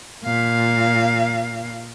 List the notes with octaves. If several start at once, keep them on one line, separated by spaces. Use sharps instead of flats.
A#2 F5